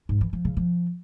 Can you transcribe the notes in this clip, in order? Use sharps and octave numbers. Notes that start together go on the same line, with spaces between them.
G#2
E3
F3
C#3
F3